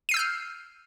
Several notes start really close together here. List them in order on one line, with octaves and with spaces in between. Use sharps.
D#7 C7 E6 G6 F6